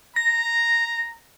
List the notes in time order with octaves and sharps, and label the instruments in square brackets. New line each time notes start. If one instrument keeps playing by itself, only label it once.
[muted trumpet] A#5 [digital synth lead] A#6